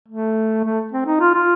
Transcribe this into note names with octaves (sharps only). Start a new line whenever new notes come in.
A3
A3
C4
D#4
F4
F4